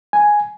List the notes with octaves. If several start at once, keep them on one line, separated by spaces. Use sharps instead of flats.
G#5